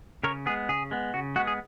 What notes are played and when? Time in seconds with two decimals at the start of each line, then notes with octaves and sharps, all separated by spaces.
0.24 C#3 A#4 C#5
0.46 G#3 B3 G#4
0.69 C#3 G#4
0.91 G#3 B3
1.14 C#3 F#4
1.36 G#3 F#4
1.39 B3
1.47 G#4